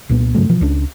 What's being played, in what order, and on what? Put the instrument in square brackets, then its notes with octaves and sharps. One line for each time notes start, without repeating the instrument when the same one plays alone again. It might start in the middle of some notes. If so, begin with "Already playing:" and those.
[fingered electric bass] C2 A#2 B3
G2 C#3 F#3 A3
B2 E3 F3
C#2 C#4 D4